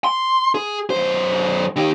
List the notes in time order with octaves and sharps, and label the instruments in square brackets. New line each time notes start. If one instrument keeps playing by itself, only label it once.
[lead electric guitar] C6
G#4
F#2 C5
D#3 G4